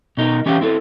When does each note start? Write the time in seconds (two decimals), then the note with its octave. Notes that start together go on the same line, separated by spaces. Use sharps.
0.17 B2 D#4 A#4
0.46 E3 C#4 G4 E5 F5 G5
0.61 C4 E4 A4